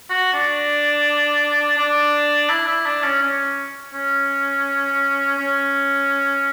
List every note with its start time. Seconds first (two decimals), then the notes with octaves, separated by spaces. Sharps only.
0.10 F#4
0.33 D4
1.78 D4
2.50 E4
2.67 E4
2.86 D4
3.04 C#4
3.23 C#4
3.94 C#4
5.38 C#4